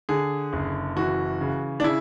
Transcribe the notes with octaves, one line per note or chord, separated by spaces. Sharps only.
D3 G#4
F#1
E3 F#4
C#3
D4
C#3 E4